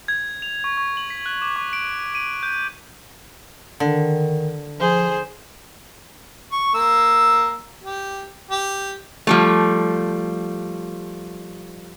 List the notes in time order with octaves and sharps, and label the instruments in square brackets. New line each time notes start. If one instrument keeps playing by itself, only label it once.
[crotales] G#6
F7
C#6
C#6
F#7
B6
F#6
D6
C#6
D7
D#7
G6
[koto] D3 [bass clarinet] D#3
[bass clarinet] F3 [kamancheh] G#4 C5
[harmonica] C#6
A#3 E6
G4
G4
[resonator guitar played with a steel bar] F3 G3 A3